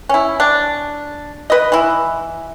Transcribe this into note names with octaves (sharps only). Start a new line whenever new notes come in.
C#4 E4
D4
B4 D#5
E3 E4